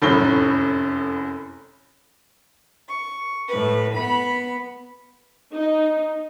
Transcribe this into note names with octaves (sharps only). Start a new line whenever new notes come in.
F1 F#2 A2 B5 G7
C#6
A2 B4
B3 B5
D#4